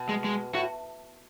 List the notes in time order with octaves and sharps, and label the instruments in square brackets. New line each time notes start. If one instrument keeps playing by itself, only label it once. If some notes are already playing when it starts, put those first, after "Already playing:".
Already playing: [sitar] B2
[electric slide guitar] G#3
G#3
[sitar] A2 [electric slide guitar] F#4